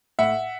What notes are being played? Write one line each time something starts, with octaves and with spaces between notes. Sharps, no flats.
A2 E5 F#5